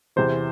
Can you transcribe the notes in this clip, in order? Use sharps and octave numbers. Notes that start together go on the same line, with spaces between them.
E2 C3 E3 C5